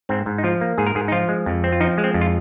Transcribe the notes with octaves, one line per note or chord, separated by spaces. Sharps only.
G#2 C4
G#2
D#4
F3 F4
A#3
G#2 G#4
A#4
G#2 G#4
D#4
F3 F4
G#3
F2
C4
F4
F3 D#4
G#3
C4
F2
F4